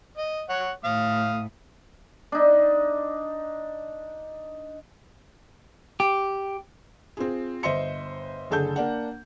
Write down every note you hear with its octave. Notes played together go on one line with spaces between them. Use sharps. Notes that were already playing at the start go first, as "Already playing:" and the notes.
D#5
C#5 F#5
A2 F5 D#6
D4 D#4
G4
C4 F4 G#4
G1 C5 D#5 E5 C6 C#7
F#1 D3 G#4 A4 A5 G6
A#3 D4 F#5